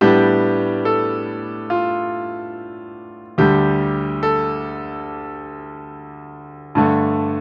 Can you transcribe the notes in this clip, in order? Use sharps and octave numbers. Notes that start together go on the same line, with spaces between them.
A2 G3 B3 D4 G4
A4
F4
D2 D3 G3 G4
A4
G2 D3 A3